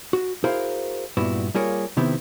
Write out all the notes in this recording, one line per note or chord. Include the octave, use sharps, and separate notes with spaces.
F#4
E4 F#4 G#4 A#4 C5 F5
G2 A#2 B3 E4 F#4
G3 A#3 F4 G#4 A#4 C#5
C3 D#3 B3 C4 E4